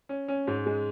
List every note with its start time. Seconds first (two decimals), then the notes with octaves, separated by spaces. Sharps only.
0.09 C#4
0.28 C#4
0.47 G#2
0.66 G#3